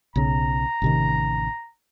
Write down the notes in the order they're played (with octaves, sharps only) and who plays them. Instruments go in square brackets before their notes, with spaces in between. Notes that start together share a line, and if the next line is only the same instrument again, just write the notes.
[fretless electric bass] B1 C#3 [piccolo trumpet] A#5
[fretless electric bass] A1 C3 D#3